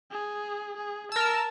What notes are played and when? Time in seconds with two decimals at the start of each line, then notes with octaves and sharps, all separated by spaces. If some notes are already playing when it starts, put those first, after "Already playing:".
0.11 G#4
0.77 G#4
1.12 A#4 A5 E6